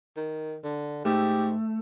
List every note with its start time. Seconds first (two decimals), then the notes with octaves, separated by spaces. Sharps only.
0.17 D#3
0.64 D3
1.05 G#2 A3 G4